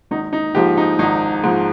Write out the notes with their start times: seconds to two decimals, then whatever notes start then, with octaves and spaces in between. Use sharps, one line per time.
0.11 G#1 D#4
0.33 D#4
0.55 G#2 F3 G4
0.77 D#4
0.99 G#1 D#4
1.44 G#2 F3